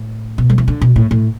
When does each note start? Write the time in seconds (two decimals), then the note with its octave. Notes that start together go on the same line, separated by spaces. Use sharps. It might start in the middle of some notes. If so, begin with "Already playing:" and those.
Already playing: A2
0.38 B2
0.50 G3
0.58 E3
0.68 D3
0.81 B2
0.96 A2
1.11 A2